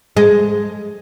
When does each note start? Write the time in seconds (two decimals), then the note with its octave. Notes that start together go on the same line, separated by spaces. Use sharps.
0.17 G#3